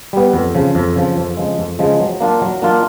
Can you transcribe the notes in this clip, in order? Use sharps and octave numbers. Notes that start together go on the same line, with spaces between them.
G3 B3
F2
C#3 F3
F2
C#3 F3
F2
C#3 F3 G#3
F2
C#3 F3 G#3
F#3
A#3 D4 F4
F#3
A#3 D4 F4